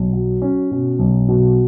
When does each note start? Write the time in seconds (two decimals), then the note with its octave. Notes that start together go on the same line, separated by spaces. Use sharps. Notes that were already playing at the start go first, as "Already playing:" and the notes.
Already playing: B1
0.13 F#3
0.42 C#4
0.71 B2
0.99 B1
1.28 B2